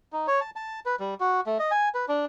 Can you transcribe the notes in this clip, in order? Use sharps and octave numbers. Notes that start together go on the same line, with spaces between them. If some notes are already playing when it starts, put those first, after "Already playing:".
D#4
C#5
A5
A5
B4
G3
F#4
A3
D#5
G#5
B4
D4